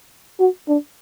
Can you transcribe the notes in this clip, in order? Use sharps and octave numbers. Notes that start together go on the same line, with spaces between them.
F#4
D4